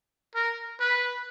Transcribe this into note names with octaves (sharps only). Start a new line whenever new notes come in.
A#4
B4